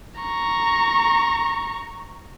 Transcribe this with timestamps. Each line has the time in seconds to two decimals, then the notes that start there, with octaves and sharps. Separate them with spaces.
0.21 A#5 C#6